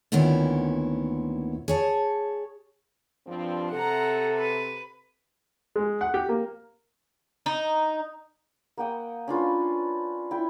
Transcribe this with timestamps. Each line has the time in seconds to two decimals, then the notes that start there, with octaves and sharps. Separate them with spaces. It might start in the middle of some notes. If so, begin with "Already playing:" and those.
0.12 D2 A#2 D#3 B3 C#4 E4
1.68 G#4 C#5 A5
3.27 G2 F3 C4
3.72 C3 A4 F#5 A#5
4.39 B4
5.76 G#3
6.01 F#5
6.14 G4
6.29 A#3
7.46 D#4
8.77 A#3 F#5 G5 D#6
9.28 C#4 D4 F4 B4
10.31 E4 G5